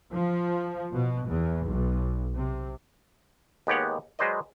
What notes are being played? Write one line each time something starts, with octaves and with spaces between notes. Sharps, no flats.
F3
B2
E2
B1
C3
D#2 G#3 B3 G4 C#5 F#5
F#3 G#3 B4 C5 D5 D#5